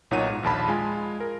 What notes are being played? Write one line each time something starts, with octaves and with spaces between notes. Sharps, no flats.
B1 A#2 D#4 C#5 F#5 D#7
G#2
A#1 D#2 A5 B5
G#3 F4 G#5
A#4